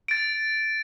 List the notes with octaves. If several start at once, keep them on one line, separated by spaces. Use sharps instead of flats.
A6 D7